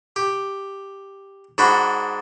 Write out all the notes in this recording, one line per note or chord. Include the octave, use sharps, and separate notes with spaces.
G4
G#2 D4 F#4 G5 B5